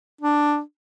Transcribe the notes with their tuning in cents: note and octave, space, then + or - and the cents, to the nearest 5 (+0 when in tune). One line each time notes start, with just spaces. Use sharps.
D4 +5